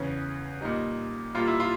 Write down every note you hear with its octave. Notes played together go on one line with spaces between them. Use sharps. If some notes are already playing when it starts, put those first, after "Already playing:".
Already playing: E2 C#3 E3 C#4
A#2 G3 D#4
A#2 G3 F4
E4
F4